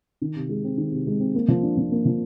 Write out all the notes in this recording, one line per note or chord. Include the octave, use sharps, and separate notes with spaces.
D#3
C3
G#3
C4
D#3
C3
G#3
C4
A#3
F3
D4
F3
A#3
F3